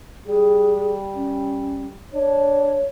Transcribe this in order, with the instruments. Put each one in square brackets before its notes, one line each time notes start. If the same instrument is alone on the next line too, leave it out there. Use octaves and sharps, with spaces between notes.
[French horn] G3 [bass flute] G#4
[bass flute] C#4
[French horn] D4 [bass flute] C#5